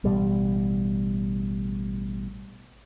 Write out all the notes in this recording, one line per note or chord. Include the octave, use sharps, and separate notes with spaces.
A1 B2 G3